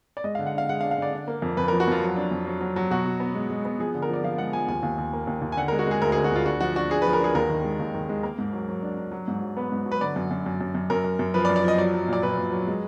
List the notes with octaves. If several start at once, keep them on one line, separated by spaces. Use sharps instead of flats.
D5
G#3 D#5
F5
D3
F#5
D4 F5
G#3 F#5
F5
D4
F5
D3 D5
D4
A#3
F2
F2 B4
A#4
F3
F#4
F2 F4
F#3
D4
F2
F#3
F#3
F#3
B2 F#4
B2
B3
G#3
G#3
B3
F3 G#4
D3
A#4
F3 D5
F3 F5
G#3 F#5
F3 G#5
D#2 G#5
D#2
D#2
A#3
D#2
D#2
G#5
D3 F#5
A#4
G#3
F#4
G#3 G#4
D2 A#4
G#4
D3
F#4
D2 F4
D4 F#4
F3 F#4
D4 F#4
D4 G#4
B4
F3
A#4
D4 G#4
D#2 A#4
D#3
G#3
D#2
D#3
G#3
A#3 A#4
G#2
F#3
F#3
D4
D4
F#3
G#2
F#3
B3 B4
G#2
F#3
B4
D3 D5
F#2
F#2
F#2
F#2
F#2
F#2 A#4
F#2
F#2
F3 B4
D5
F#2
D5
F3 D#5
F#3 D5
F#3
A#2 D5
A#2 B4
A#2
F#3
G#3